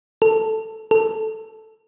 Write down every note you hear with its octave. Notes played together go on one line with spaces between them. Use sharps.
A4
A4